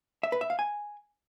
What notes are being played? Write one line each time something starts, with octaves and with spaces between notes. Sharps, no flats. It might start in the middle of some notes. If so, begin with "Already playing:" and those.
E5
B4
E5
F5
G#5